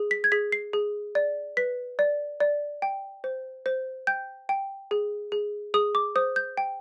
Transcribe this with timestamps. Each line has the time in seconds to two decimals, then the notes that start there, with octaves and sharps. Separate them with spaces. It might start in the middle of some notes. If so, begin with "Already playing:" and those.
Already playing: G#4
0.11 B6
0.24 G#6
0.32 G#4 B6
0.52 C7
0.73 G#4
1.15 D5
1.57 B4 B6
1.99 D5
2.40 D5
2.82 G5
3.24 C5
3.66 C5
4.07 G5 G6
4.49 G5
4.91 G#4
5.32 G#4
5.74 G#4 D#6
5.95 D6
6.16 C5 D#6
6.36 G6
6.57 G5